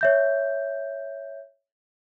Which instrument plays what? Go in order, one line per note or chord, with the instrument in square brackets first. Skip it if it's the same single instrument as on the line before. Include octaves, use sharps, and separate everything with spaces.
[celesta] C#5 E5 G6